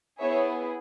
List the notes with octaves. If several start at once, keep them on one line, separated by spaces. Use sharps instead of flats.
B3 E4 G#4 C#5 E5